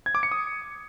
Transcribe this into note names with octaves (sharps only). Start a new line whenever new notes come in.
G#6
D6
C#7
D#6